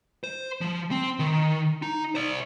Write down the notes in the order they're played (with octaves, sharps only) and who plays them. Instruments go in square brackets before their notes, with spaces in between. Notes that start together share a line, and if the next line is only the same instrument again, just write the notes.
[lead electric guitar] C5
F3
C4
D#3
D#4
C5 D5